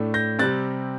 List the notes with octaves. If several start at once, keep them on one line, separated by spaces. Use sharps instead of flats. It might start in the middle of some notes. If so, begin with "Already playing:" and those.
Already playing: A2 A3 D4
G6 A#6
C3 G3 C4 F#6 A6